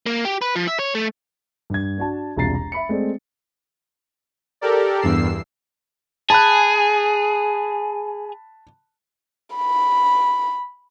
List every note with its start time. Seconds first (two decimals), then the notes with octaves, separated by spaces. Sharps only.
0.06 A#3
0.25 G4
0.42 B4
0.56 F3
0.67 E5
0.79 C#5
0.95 A3
1.70 G2 G#6
1.98 D4 F#4 A5
2.36 E1 C2 F4 A#5 A6 C7
2.54 A#5
2.72 E5 B5 C#7
2.89 G#3 A3 C4 D5
4.61 G4 A4 A#4 D5
5.02 E2 G2 E6 C7
6.30 G#4 A5 B5 F#6
9.56 B5